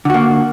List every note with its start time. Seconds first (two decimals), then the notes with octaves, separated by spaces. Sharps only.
0.05 D3
0.10 F#4
0.14 A#3